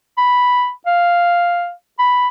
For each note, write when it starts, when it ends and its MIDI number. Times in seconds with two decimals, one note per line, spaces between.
0.17 0.70 83
0.86 1.72 77
1.99 2.28 83